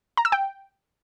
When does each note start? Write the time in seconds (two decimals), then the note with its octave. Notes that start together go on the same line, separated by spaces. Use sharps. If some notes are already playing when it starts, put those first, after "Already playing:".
0.17 A#5
0.25 E6
0.32 G5